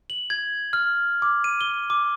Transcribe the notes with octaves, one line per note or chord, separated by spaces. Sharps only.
F#7
G#6
F6
D6
D#7
G7
D6